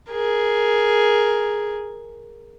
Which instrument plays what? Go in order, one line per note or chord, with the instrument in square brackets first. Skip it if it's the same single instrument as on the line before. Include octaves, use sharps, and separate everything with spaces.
[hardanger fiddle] G#4 A#4